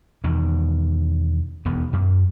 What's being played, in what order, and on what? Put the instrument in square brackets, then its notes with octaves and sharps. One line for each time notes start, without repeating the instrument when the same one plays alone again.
[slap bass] E2 B2 D#3
E1 D#2 B3
F#2